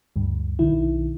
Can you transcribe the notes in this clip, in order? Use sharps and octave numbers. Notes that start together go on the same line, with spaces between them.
D2 G2
B1 D#3 E4